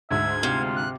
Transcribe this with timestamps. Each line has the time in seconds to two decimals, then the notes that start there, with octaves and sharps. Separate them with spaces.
0.11 D2 G#2 E5 G#6
0.43 C3 F4
0.76 F#6